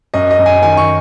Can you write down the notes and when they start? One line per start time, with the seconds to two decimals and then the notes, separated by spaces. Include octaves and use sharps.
0.14 F#2 D#5
0.31 D#5
0.39 F#2
0.46 G#5
0.62 D#3 G#5
0.77 C#6